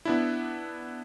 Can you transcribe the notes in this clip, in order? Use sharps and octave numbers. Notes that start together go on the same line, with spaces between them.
B3 D4 E4